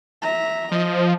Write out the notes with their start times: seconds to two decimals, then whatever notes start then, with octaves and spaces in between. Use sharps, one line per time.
0.22 E5 A#5
0.71 F3 D#5